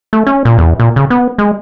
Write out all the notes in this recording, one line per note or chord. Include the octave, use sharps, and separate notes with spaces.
A3
C#4
A#2
E2
A#2
C#3
B3
G#3